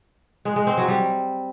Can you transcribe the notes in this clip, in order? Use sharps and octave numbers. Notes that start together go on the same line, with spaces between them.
G#3
G#3
C4
F#3
G3